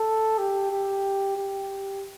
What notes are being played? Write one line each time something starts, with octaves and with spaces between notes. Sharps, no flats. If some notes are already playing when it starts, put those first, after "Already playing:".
Already playing: A4
G4
G4
G4